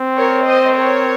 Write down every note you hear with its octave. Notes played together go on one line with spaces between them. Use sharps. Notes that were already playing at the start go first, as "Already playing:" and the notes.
Already playing: C4
A#4 C#5
C5 D#5
A#4 C#5